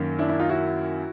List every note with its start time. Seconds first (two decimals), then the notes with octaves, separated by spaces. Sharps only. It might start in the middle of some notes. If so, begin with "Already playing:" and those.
Already playing: F#2 D#3 F#3 A#3 C#4
0.19 D4 E4
0.29 D4 E4
0.39 D#4 F4
0.49 E4 F#4